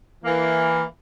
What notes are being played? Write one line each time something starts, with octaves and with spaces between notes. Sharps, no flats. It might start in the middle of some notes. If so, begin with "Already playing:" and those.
E3 A#3